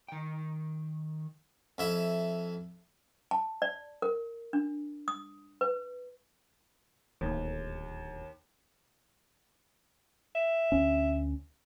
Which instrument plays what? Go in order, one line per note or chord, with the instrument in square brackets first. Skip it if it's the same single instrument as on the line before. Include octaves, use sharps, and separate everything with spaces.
[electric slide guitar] D#3 G5
[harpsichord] F2 E4 E5
[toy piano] A5
D5
A#4
D4
D#6
B4
[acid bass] D1 [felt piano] D#2
[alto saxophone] E5
[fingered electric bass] D2 C#4